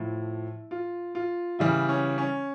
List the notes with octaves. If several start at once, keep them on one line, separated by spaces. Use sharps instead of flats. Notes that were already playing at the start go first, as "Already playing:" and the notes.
Already playing: A2 F3 E4
F4
F4
C#3 E3 G3 E4
C#4
C#4